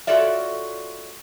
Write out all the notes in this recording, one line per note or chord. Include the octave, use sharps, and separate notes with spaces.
F4 F#4 A4 C#5 D5 E5